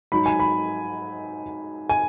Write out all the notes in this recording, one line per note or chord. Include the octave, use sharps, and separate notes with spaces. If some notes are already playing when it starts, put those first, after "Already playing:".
G#2 F#3 D#4 B5
G#5
B5
G#5